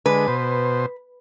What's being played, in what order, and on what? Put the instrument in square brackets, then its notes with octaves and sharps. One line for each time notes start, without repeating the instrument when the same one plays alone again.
[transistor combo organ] D3 G#3 [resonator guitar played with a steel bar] B4
[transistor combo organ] B2 C5